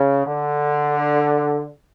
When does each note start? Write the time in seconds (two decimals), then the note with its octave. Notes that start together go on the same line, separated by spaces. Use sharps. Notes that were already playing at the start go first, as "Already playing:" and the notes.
Already playing: C#3
0.26 D3